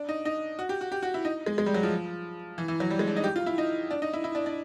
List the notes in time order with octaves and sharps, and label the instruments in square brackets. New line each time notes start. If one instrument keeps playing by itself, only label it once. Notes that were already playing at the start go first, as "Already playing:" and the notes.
Already playing: [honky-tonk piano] D4
D#4
D#4
F#4
G4
F#4
G4
F#4
E4
D#4
G#3
G#3
G3
F#3
F3
E3
E3
F#3
G3
G#3
D4
D#4
G4
F4
E4
D#4
D4
D#4
E4
E4
D4
D4